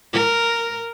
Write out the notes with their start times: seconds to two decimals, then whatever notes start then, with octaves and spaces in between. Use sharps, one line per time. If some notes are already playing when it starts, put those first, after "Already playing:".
0.13 A#4